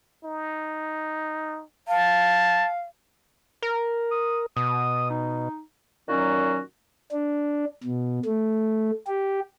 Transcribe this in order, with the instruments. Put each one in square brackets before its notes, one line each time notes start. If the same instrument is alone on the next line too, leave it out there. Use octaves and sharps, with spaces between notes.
[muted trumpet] D#4
[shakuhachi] F5 [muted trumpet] A5
[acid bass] A#4
[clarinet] D#6
[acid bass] B2 [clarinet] D#6
[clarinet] D#4
[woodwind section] A#2 D#3 F#3 C#4 F#4
[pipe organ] D4
B2
A3
G4